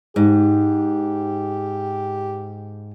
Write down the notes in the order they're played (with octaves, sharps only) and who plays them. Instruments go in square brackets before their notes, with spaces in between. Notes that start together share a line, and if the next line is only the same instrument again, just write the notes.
[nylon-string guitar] G#2 [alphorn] G4